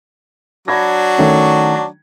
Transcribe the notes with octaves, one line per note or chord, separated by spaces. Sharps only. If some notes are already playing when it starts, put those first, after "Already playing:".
F#3 D4 F#4 B5 G#6 A#6
D#3 A3 C#4